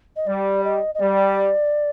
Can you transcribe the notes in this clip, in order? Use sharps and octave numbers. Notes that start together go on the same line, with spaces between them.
D#5
G3 D5
D#5
D#5
G3 D5